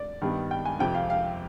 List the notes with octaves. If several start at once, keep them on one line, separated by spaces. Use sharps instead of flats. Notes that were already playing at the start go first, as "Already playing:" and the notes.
Already playing: D5
G2 D#3 G3 B3
G5
G#5
F2 C3 F3 G5
F5
F5